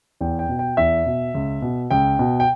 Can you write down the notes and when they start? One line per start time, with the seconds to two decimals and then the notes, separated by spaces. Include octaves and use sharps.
0.21 E2 G5
0.39 G5
0.49 B2
0.59 G5
0.77 E2 E5
1.06 B2
1.35 C#2
1.62 B2
1.91 C#2 G5
2.19 B2
2.40 G5